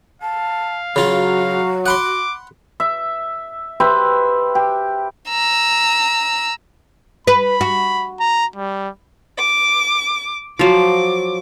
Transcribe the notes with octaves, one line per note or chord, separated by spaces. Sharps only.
F5 A5
C#3 F#3 F4 F#4
F#5 B5 C6 D6
E5
G4 B4 C5 E5
G4
A#5 E6
B4 B5
F#4
A#5
G3
D6
F3 F#3 D6